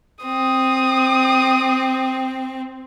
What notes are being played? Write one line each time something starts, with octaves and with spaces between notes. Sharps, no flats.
C4 D#6